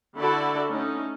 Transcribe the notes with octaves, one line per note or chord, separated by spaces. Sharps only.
D3 E4 F#4 A4 D5
A3 C#4 D#4